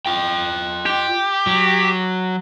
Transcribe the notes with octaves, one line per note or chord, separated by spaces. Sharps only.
F4 G5
G4
F#3